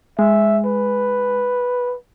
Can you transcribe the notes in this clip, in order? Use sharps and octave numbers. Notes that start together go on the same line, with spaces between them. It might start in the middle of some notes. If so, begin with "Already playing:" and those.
G#3 E5
B4